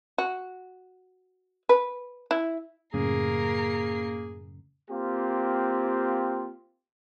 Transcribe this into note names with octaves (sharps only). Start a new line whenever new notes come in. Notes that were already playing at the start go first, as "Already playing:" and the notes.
F#4
B4
E4
F#2 A2 C#3 A#3 G#4 A#4 C7
A#3 C4 F4 G4